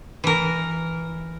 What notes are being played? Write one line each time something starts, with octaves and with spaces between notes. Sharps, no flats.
E3 A#4